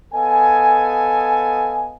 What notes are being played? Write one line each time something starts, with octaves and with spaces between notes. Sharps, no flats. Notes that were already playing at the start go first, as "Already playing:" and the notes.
B3 A4 D#5 F5 G#5